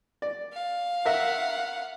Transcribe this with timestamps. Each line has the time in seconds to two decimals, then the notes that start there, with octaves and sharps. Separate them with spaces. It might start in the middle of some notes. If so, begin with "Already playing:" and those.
0.22 D5
0.53 F5
1.06 A#4 E5 F#5